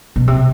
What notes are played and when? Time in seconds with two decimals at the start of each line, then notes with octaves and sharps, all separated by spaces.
0.16 B2
0.27 C3